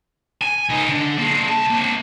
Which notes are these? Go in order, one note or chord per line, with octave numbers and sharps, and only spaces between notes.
G#5
C#2 D#4
D3
A#3 G#4
C2 A5
A#3 C4